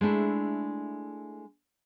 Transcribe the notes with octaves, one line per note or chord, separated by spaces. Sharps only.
G#3 A3 D4 E4